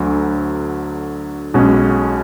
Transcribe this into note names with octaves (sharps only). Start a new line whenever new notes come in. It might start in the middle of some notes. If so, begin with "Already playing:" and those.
Already playing: D2 D3 F#3
B1 B2 G#3 C#4 F#4